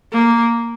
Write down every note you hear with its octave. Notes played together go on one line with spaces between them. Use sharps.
A#3